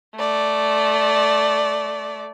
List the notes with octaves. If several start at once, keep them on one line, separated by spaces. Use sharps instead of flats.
A3 D5